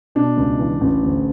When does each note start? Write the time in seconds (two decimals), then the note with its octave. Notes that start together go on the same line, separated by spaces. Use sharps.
0.15 B2 D4
0.37 C#2
0.59 E3
0.81 A1
1.03 D2